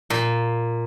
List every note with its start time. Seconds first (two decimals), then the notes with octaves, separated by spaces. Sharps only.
0.10 A#2